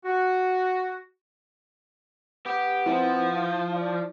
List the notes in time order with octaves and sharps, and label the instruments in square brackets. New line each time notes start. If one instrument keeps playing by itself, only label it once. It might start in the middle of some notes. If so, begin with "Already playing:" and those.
[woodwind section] F#4
[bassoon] B3 [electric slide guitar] G4
[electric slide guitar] F3 [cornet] C4 [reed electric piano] E4
[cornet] F5
D5